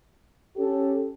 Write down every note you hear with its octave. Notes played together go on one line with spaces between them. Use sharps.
C#4 G4 A4